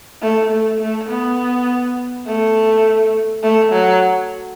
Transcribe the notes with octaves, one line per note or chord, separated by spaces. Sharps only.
A3
A3
A3
B3
A3
A3
F#3